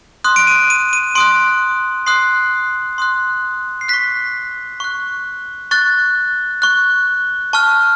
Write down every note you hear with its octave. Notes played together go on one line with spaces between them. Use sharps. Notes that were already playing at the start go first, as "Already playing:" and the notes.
C6 D#6 F#6
D7
D#7
D#7
D#7
C6 D#6 F#6 D7
C6 D#6 F#6 C7
C6 D#6 F#6
C7
C#6 F#6 B6
C#6 F#6
C#6 F#6 A6
C#6 F#6
A5 C#6 F6